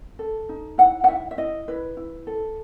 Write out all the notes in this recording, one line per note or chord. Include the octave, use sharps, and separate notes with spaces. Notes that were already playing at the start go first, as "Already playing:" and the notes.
A4
D#4
E4 F#5
F#5
E4 E5
E5
E4 D#5
E4 B4
E4
A4